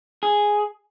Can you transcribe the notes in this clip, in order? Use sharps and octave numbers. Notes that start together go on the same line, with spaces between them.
G#4